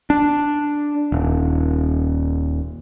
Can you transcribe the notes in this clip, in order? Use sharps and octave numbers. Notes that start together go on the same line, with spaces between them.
D4
D#1